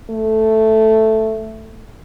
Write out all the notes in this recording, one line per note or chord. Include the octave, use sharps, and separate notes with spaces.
A3